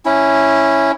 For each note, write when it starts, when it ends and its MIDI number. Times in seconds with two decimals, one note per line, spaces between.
0.05 0.92 61
0.05 0.92 64